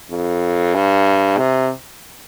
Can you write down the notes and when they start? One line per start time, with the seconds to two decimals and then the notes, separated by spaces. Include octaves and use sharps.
0.11 F2
0.74 G2
1.38 C3